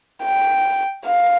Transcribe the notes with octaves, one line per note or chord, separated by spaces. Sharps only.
G5
F5